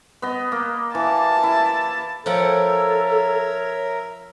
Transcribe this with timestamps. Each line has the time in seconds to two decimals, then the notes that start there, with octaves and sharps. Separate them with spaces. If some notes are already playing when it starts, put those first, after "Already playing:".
0.22 B3 D#5
0.52 A#3
0.95 E3 A5
1.43 E4
2.26 F3 A4 A#4 C#5 E5 F#5 G5 A#5